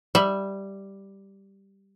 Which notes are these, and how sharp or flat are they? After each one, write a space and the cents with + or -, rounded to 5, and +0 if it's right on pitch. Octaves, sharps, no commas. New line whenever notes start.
G3 +0 E5 +0